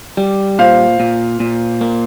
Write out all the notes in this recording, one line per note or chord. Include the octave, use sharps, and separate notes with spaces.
G3
A#2 C5 F5
A#2
A#2
A#3